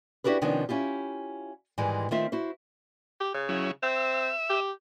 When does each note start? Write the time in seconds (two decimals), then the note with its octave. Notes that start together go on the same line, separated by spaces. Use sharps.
0.24 D4 E4 F#4 G4 A#4 B4
0.41 C3 D#3 F3 B3 C#4 D4
0.69 C#4 E4 F4 G4
1.78 G#2 D#3 E3 G3 G#3
2.11 D#3 A3 C4 F4 C5 E5
2.32 E4 F#4 C5
3.21 G4
3.34 C#3
3.49 F#3 C#4 E4
3.83 C4 E5
4.50 G4